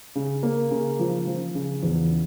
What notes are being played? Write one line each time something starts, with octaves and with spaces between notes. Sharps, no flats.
C#3
A#3
C#3
F3
F3
C#3
E2